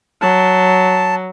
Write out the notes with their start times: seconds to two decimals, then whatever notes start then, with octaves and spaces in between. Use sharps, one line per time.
0.22 F#3 A5